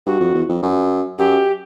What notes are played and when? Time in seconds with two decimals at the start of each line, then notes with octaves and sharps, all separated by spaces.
0.06 G2 F#4
0.20 F2
0.34 E2
0.49 F2
0.62 F#2
1.18 F#2 G4